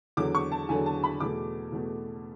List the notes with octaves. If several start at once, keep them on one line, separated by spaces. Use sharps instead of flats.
E2 D3 F#3 D6
C#6
A5
E2 D3 F#3 G#5
A5
B5
E2 B2 A3 D6
E2 B2 A3